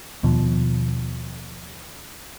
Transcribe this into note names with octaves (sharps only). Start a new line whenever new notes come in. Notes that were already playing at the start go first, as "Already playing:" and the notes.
D#2 B2 F3